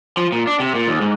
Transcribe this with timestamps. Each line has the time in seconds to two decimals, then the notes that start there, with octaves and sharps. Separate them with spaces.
0.17 F3
0.32 A#2
0.47 D4
0.60 C3
0.75 A#2
0.88 D#2
1.01 G#2